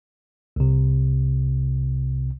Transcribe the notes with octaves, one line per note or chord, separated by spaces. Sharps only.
C2 C3